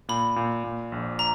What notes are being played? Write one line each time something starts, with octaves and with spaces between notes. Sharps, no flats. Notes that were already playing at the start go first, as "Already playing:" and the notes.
A#2 B5
A#2
A#2
A#1
A#5